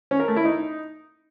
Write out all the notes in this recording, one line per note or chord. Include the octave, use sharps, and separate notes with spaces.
C#4
A#4
A3
E4
D#4